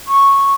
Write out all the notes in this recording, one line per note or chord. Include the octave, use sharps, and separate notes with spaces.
C#6